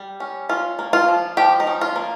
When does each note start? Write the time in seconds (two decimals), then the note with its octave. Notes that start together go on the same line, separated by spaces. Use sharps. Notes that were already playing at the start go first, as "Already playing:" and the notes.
Already playing: G3
0.20 C#4
0.49 C#4 F4
0.79 A#3
0.93 F4
1.08 F3
1.37 F3 G4
1.60 D#4
1.67 C#4
1.81 F4
1.96 A#3